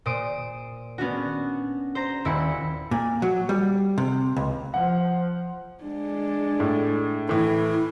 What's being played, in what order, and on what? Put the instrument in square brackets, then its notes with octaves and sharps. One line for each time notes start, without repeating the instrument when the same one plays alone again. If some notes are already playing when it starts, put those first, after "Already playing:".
[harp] A#2 C5 D#6 D7
B3 C#4 D4 F#4
C5 A#5
D#1 E4 B5 C#7
[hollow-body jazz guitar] A#2
F#3
G3
C3
C#2
[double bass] F3 [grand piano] F#5
[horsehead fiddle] G#3 D4
[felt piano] A2
[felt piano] A2 E3 [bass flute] E4